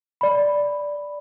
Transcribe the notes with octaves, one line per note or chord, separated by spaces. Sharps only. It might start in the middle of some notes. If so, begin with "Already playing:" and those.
D5 B5